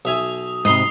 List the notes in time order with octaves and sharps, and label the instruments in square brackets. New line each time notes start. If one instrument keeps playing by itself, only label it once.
[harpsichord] B1 E5 G#5 [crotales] D#6 F7
[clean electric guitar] G#2 C3 [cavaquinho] D#5 B5 [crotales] D#6 C7 G7